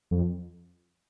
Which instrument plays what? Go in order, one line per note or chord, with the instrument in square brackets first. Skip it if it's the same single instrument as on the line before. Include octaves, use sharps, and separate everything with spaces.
[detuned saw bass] F2